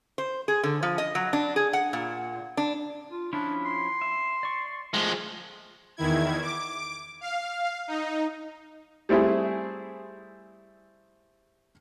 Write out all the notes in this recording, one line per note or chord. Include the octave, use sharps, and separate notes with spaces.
C5
G#4
D3
F3
D#5
F#3
D4
G#4
F#5
A#2
D4
F4
F3 C#4 D4 E4
C6
E5
D5 C#6
F3 G#3 A3
E2 D#3 E4 G#6
D6
F5
D#4
G3 A3 C4 E4 G#4